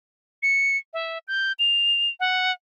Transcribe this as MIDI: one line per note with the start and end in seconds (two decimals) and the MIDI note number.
0.43 0.77 97
0.93 1.18 76
1.28 1.52 91
1.59 2.10 101
2.20 2.52 78